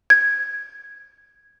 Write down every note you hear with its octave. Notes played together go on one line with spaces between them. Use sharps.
G#6